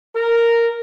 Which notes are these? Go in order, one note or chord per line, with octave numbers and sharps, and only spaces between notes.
A#4